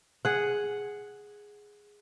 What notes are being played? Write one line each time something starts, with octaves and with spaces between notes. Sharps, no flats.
G#4 F#5